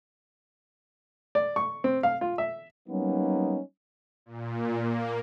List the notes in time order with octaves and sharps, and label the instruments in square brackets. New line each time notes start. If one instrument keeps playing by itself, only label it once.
[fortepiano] D5
C#6
C4
F5
F4
E5
[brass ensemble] F#3 G3 A#3 B3 C#4 D#4
[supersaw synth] A#2
A#3